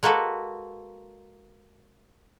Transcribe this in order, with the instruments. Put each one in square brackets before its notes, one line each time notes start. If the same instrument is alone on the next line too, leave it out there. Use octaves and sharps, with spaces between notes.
[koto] G#3 A#3 F#4 A4 B4